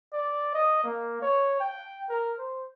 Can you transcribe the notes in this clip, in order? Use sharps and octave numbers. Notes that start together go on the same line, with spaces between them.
D5
D#5
A#3
C#5
G5
A#4
C5